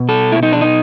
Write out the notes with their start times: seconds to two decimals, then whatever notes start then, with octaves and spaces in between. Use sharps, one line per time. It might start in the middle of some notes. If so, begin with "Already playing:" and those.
Already playing: B2
0.09 A4
0.32 E4
0.43 D#4
0.53 D4
0.61 D#4